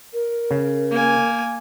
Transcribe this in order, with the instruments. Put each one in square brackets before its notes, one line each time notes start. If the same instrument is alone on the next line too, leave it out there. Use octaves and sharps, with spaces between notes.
[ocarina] A#4
[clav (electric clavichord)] C#3
[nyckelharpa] A#3 G#5